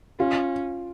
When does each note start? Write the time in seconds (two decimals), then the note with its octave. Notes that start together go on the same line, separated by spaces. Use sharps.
0.19 C#4 F4